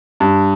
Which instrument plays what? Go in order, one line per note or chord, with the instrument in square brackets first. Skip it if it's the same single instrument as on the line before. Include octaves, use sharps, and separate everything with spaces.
[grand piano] G2